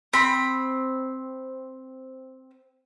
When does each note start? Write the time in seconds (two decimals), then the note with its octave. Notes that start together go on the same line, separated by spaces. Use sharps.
0.13 C4 B5